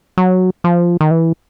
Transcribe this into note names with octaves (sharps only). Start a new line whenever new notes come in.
F#3
F3
D#3
E3